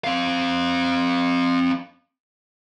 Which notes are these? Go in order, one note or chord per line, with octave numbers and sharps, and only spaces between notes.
C4 F5